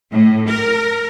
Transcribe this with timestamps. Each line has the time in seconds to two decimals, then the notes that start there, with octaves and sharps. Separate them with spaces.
0.11 A2
0.49 A#4